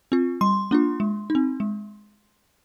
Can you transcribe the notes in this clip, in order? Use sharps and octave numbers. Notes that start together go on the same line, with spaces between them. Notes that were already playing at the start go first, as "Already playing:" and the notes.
C4 F4
G3 C6
A#3 D4 F4
G#3
D#4
C4
G#3